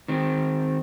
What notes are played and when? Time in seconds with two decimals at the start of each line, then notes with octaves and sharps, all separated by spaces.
0.08 D#3 C4